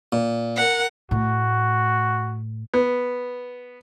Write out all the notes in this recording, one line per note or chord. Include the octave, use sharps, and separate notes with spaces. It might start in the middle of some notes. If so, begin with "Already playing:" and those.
A#2
A#4 F#5
A2 F#4
B3